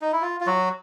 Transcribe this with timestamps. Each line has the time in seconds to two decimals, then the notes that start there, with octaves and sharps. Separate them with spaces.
0.02 D#4
0.13 E4
0.22 F4
0.40 F4
0.47 F#3 F#4